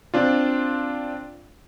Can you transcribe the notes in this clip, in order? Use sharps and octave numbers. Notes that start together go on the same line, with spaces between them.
C4 D4 F4